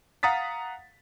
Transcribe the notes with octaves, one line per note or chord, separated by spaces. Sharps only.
F5 F#5 A#5 D#6 A6 B6